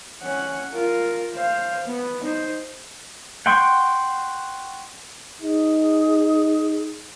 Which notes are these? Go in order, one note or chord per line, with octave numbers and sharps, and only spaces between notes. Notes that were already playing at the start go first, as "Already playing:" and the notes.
C#4 F#5
F4 A#4
C5 F5
B3
D#4 C5
F#5 G5 C6 C#6
D#4 G#4